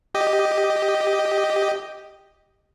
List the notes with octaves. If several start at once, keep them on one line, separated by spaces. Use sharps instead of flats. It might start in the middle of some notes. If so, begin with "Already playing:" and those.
G4 D#5